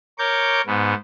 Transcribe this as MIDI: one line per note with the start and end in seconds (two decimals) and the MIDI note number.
0.18 0.61 70
0.18 0.61 73
0.18 0.61 86
0.18 0.61 91
0.67 0.94 44
0.67 0.94 59